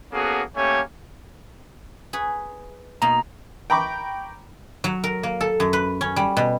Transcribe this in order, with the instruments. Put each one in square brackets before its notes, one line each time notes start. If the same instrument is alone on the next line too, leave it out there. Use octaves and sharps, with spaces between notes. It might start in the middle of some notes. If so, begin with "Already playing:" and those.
[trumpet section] A#3 B3 C#4 F#4 G#4 A4
A3 A#3 C#4 G4 C#5 G#5
[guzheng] G#4 B4 C#5
[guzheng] B2 A#3 D#4 [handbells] A#5
[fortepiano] G5 A#5 B5 C#6 D6
[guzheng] F#3
A#4
A#3
A4
F#2
B4
C#4
G3
B2